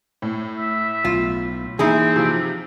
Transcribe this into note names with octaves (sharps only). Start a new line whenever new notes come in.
A2
E5
B1 F4
E3 A#3 C4 D#4 E4 G#4
C3 F3